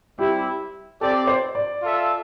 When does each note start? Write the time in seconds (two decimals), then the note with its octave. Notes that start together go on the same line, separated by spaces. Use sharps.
0.18 G3 C4 E4 G4
1.01 C4 G4 A4 D5
1.27 C5
1.55 D5
1.82 F4 A4 E5